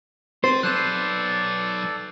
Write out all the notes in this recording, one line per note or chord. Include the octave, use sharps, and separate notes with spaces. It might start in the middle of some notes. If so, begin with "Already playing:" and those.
C4 C5 A6 C7 D#7
F#3 A4 B4 D5 E6 F#6 G6 E7